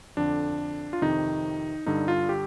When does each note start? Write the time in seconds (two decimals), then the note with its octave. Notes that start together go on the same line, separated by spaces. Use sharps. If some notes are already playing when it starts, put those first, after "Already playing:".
0.17 F2 D3 D4
0.93 F4
1.02 F2 C3 D#3 D#4
1.86 G2 D3 D#4
2.08 F4
2.29 G4